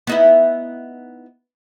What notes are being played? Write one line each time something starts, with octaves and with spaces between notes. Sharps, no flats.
B3 D#4 E4